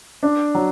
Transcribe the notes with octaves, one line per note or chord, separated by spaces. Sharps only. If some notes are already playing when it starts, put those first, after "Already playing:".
D4
F#3